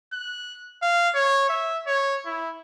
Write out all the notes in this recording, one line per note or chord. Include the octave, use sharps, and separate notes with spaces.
F#6
F5
C#5
E5
C#5
E4